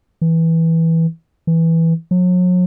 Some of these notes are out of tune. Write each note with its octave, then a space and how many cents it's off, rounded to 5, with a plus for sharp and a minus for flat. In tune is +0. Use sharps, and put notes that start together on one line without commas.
E3 -10
E3 -5
F#3 -40